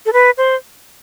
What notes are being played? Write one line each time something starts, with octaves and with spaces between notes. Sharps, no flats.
A4
B4
C5